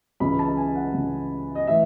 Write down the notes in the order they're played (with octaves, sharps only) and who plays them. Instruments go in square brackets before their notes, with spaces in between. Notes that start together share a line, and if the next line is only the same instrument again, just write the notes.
[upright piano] C#2 C#3 E3 B5
A5
G#5
F#5
C#2 C#3 E3
D#5
A2 E3 E5